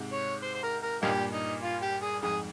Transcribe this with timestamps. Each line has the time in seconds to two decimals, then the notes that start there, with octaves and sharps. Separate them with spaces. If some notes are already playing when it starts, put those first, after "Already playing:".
Already playing: G#2 C3
0.12 C#5
0.43 C5
0.55 C5
0.63 A#4
0.83 A#4
1.03 G2 A#2 A#3 D#4 G4
1.33 D#4
1.63 F4
1.82 G4
2.02 G#4
2.23 F2 G#2 G#4